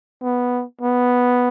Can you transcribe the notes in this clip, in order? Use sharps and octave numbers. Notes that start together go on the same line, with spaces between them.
B3
B3